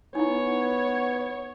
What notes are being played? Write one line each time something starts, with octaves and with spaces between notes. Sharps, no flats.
B3 D#4 E4 C#5